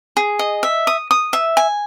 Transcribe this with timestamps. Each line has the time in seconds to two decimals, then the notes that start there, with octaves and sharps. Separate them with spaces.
0.17 G#4
0.39 D#5
0.63 E5
0.87 D#6
1.11 D#6
1.33 E5
1.57 G#5